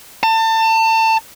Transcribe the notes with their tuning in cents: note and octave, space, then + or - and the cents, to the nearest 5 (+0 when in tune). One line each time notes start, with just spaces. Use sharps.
A5 +30